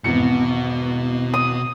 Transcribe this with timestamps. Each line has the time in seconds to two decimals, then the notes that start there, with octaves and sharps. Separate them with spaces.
0.04 G#1 E2 B2 C#7
1.34 D#6